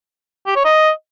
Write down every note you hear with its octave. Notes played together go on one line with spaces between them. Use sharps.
G4
C#5
D#5